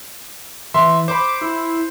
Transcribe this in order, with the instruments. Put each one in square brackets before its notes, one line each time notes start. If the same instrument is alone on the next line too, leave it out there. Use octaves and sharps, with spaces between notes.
[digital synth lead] E3 [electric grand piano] E5 C6
[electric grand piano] C5 B5 [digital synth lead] D6
[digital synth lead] E4